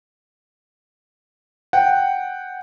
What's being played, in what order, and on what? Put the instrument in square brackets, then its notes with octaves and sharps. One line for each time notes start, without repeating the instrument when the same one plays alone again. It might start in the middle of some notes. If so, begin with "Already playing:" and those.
[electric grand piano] F#5 G5